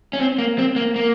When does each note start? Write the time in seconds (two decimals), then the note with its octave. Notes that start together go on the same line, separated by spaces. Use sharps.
0.13 C#4
0.19 C4
0.38 A#3
0.58 C4
0.76 A#3
0.96 A#3